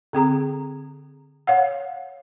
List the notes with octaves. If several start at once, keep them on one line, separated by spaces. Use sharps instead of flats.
D3 C4 G#4 A#5
C#5 F5 F#5